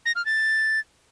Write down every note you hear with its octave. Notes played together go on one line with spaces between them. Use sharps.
A#6
F6
A6